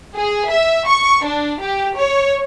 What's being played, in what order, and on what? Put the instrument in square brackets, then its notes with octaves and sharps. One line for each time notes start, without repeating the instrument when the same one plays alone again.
[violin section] G#4
E5
C#6
D4
G4
C#5